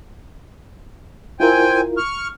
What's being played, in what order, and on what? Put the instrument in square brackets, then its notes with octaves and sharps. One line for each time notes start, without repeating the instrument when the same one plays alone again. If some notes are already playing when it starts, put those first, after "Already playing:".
[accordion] C4 G5 G#5 [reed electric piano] E4 F4 A#4
[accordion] C#6 F6